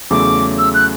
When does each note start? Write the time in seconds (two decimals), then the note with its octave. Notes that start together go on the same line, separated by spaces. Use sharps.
0.10 E2 C#3 F#3 A3 E4 D6
0.58 E6
0.74 F#6